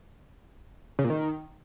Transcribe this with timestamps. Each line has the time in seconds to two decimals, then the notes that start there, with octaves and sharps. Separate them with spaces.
0.99 C#3
1.04 A#2
1.10 D#3